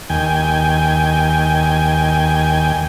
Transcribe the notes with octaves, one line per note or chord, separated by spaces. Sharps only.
D#2 G5 G#5